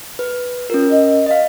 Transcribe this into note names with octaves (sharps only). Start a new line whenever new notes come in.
B4
C#4 F4 A#4
D#5
D#5 F5